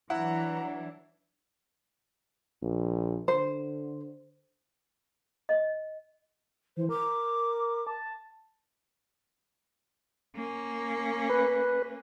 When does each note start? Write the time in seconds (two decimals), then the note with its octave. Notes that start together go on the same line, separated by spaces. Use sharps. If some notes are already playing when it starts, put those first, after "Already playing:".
0.10 E3 F#3 D4 E4 F#5 A#5
2.62 A#1
3.28 D3 C5
5.49 D#5
6.77 E3 C5
6.89 A#4 D6
7.87 A5
10.36 A#3 C#4
11.30 B4